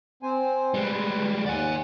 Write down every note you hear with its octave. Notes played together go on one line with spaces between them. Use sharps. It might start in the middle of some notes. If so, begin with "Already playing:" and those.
C4 C5 G#5
G3 G#3 B4
D#2 D5 F#5 G#5